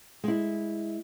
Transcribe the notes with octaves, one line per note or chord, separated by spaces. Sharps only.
G#3 E4